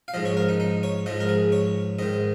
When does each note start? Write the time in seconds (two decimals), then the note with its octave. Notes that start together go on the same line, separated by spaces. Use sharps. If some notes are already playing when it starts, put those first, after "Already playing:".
0.08 F5
0.14 G#2 F3 D#5
0.25 C#5
0.37 A#4
0.49 D#4
0.60 D#4
0.83 C#5
1.06 G#2 F3 D#5
1.20 A#4
1.29 G#4
1.52 C#5
1.99 G#2 D#3 D#5